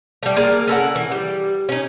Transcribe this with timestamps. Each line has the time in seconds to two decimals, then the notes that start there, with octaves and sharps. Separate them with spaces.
0.23 G3 A3
0.36 A#3 G#4 D5 A#5
0.67 C#4 A4 A#4 F#5
0.95 E3
1.11 G3
1.69 C#4 D#4